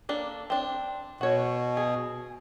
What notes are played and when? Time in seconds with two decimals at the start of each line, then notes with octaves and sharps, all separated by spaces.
0.09 A#3 D4 A4
0.50 C4 D4
1.21 B2 F#4 C#5
1.77 G#4